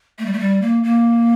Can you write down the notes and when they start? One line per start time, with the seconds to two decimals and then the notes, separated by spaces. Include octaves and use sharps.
0.18 A3
0.26 G3
0.33 A3
0.40 G3
0.62 A#3
0.84 A#3